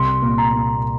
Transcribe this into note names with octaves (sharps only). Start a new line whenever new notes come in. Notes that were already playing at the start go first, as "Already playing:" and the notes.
Already playing: C2 C6
A#2
A#5
A#3